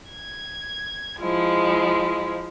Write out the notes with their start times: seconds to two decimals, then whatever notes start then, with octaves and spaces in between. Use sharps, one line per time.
0.11 G#6
1.20 F3 G#3 E4